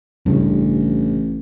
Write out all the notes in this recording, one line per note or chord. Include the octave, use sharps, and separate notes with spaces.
A1 G2 C#3